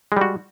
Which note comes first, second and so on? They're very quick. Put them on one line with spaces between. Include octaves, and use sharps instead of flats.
G#3 G3 F#4